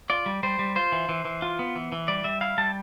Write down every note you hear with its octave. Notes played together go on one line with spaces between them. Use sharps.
F4 D5
G3
G3 C5
G3
F4 C5
E3
E3
E3
F4
B3
E3
E3
G3 D5
G3 E5
E4 F5
G3 A5